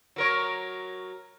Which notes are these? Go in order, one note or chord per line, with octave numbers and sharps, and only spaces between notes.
F#3 A#4 C#5